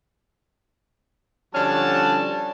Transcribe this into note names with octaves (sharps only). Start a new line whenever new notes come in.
D3 F3 G3 C#4 F#4 A5